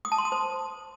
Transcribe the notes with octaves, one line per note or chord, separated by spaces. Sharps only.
D#6
A5
C6
D#6
C5